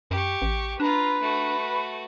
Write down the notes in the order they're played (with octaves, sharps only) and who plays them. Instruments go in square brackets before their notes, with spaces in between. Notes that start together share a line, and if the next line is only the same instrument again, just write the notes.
[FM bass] F#2 [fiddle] G4 C#6
[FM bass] A1
[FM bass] D4 [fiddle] F4 A#5 [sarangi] B4
[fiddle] A3 F#4